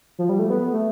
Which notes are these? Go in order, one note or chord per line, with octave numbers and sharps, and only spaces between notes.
F3
G3
A3
B3
A3